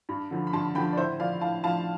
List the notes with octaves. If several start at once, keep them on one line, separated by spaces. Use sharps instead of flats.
G2
D3 F3
B5
G2 A5 C6
D3 F3 G5 B5
D5
A2 C5 E5
F3 D5 F5
A2 F5 A5
F3 F5 A5